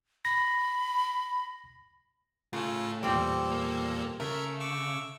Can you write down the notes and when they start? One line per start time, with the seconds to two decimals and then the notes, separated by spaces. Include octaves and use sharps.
0.25 B5 A#6
2.53 A2 C#3 F4 A4
3.03 E2 A#2 G3 C4 A4
3.52 A#3
4.20 C#3 A3 A#4 E5
4.60 C#6 D6 E6